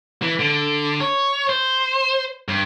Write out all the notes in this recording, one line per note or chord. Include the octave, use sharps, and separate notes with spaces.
E3
D3
C#5
C5
G2